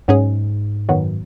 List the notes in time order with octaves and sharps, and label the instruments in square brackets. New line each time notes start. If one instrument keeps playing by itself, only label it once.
[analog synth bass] G#2 [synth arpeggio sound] F#3 C#4 G#4
[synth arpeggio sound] F#2 D#3 F#3 B3